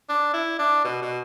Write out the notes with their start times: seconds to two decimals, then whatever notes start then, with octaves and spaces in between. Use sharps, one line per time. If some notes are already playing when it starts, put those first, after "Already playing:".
0.09 D4
0.34 E4
0.59 D4
0.84 B2
1.02 B2